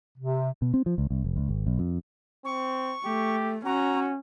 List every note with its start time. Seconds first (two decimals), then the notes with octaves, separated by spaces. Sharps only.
0.18 C3
0.62 B2
0.74 C4
0.86 F3
0.98 C#2
1.10 C2
1.24 F1
1.36 C#2
1.49 G#1
1.66 B1
1.79 F2
2.45 C4 C#6
3.05 A3 G4
3.65 C#4 F#4 A#5